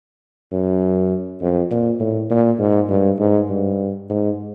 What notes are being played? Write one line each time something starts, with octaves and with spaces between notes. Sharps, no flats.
F#2
F2
A#2
A2
A#2
G#2
G2
G#2
G2
G#2